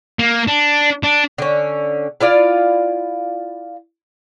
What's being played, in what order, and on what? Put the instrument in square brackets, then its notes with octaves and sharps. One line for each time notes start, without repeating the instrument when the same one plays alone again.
[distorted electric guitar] A#3
D4
D4
[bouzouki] D3 C#4
E4 F4 D5 F5